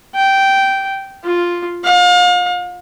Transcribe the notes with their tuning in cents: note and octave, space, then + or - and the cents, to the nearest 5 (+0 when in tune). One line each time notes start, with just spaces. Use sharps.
G5 -10
F4 +0
F5 +35